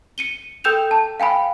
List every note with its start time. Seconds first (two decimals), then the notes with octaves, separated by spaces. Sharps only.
0.18 C#7 D#7 G7
0.64 A4 G5 E6 G6 E7 F7
0.91 A5
1.20 F5 G5 G#5 B5